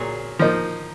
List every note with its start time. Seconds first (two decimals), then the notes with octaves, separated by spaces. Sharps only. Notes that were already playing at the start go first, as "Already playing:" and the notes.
Already playing: A#2 F#3 G#4
0.39 F3 A#3 D#4